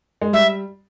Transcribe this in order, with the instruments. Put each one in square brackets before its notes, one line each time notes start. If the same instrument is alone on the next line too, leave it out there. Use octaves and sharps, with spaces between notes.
[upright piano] G#3
[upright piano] G3 [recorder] E5